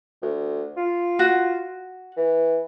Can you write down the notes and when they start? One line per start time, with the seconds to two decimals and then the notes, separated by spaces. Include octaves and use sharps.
0.22 D2
0.77 F4
1.19 F#4
2.17 E3